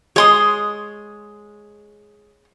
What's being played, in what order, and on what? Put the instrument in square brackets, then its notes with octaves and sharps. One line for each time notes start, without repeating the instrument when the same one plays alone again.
[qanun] G#3 [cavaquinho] C#5 C6 D#6